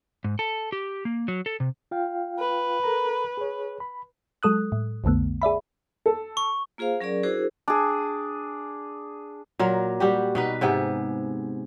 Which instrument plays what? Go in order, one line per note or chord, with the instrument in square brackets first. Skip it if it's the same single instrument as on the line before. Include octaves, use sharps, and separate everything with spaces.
[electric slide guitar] G#2
A4
G4
A#3
F#3
A4
C3
[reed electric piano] F4 F5 G5
[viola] B4
[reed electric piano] A4 A#4 A#5
G#4 C#5
B5
[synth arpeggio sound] F#3 G#3 A4 D#6 F#6
A2
B1 F2 D3 A3 B3
G#4 D5 E5 B5
[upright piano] A4
[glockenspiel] C#6
[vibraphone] A#3 F4 G#4 C5 F5
F#3 C#4 G#4 A#4 D5
D4 E4 F#4 G#4 A#4 C5
[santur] D4 G#4
[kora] A#2 F#3 A#4
G3 F#4 G4
B2 D#4 B4
G#2 C3 B3 G#4